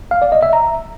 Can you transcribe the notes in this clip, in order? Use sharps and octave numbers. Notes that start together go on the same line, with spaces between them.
F5
D5
D#5
E5
A#5